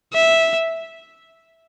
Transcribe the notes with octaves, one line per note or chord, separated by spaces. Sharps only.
E5